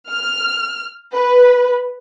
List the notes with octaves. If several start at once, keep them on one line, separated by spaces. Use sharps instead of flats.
F6
B4